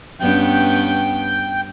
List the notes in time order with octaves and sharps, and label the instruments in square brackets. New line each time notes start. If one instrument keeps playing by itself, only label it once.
[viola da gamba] G2 B3 C#4 [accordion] G5 G6